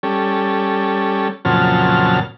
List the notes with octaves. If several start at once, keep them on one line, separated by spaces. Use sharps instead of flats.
G3 C#4 A4
F2 A#2 C#3 F#3 A5 F6